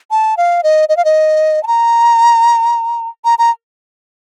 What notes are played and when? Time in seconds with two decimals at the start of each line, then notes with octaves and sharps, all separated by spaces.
0.11 A5
0.37 F5
0.63 D#5
0.89 D#5
0.97 F5
1.05 D#5
1.63 A5
1.67 A#5
3.25 A#5
3.39 A#5